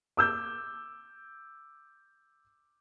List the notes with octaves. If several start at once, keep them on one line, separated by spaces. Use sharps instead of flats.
D6 E6 G6